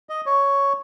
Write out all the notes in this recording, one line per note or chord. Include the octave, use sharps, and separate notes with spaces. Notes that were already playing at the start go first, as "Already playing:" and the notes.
D#5
C#5